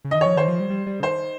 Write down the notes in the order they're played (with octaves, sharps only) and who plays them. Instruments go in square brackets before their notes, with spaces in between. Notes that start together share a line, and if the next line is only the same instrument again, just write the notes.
[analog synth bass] C#3
[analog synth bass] D#3 [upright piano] D#5
[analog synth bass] F3 [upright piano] C#5
[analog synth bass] D#3 [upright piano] C5
[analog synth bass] F3
G3
G3
G3
C#3
[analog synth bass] D#3 [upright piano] C5